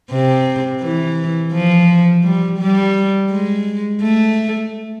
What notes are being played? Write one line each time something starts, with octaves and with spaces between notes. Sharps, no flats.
C3
E3
F3
G3
G3
G#3
A3